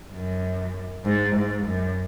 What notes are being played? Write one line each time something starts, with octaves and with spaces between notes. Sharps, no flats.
F#2
G#2
G#2
F#2